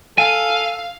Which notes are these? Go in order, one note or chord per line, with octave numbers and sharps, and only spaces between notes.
A4 F5 G#5